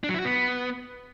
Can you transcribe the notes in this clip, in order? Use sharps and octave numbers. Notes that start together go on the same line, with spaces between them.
D4
F#3
E4
F#4
B3